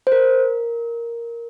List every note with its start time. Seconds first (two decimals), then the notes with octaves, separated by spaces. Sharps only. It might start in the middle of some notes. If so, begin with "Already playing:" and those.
0.07 C5
0.12 A#4